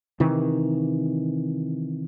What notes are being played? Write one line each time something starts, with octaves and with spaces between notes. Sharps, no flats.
C3 D#3 E3